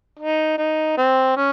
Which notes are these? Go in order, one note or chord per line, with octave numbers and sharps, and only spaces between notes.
D#4
D#4
C4
C#4